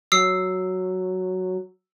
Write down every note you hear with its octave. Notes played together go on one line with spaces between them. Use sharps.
F#3 D#6 E6 C7